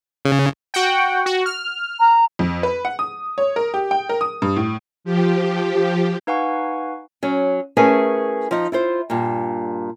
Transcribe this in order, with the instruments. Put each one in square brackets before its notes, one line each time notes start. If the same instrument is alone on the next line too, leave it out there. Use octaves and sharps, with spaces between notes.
[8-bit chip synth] C#3
[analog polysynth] F#4 F#5 G5
F#4
F6
[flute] A#5
[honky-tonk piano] F2
B4
F#5
D#6
C#5
A#4
G4
G5
A#4
D#6
G2
A2
[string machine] F3 G4
[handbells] D#4 B4 F5 F#5 G#5 C#6
[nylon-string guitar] F#3 C#4
A3 C#4 E4 G#4 A#4 B4
F3 D#4
E4 F4 C5
G2 A#2